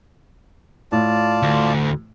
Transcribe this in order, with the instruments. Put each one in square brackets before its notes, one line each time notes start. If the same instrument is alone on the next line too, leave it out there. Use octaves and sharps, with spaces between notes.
[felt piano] A2 [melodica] F4 D5 A5
[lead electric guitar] D2